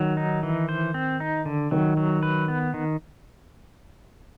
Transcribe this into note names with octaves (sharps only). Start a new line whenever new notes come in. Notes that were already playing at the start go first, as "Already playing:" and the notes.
Already playing: D#3 F#3
D#4
E3
C5
C4
D#4
D3
D#3 F#3
F#3
B4
B3
D#3